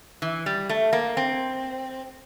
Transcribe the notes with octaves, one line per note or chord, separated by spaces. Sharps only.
E3
G3
A3
A#3
C4